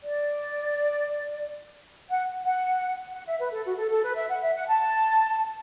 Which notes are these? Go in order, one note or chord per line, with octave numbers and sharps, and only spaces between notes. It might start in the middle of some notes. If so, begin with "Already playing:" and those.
D5
F#5
F#5
F#5
E5
B4
A4
F#4
A4
A4
B4
E5
F#5
E5
F#5
A5